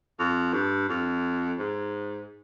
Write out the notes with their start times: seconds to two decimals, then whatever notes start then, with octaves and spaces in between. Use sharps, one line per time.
0.19 F2
0.54 G2
0.89 F2
1.59 G#2